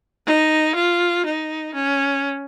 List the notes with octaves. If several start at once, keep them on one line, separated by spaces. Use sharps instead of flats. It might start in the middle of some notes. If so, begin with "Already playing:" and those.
D#4
F4
D#4
C#4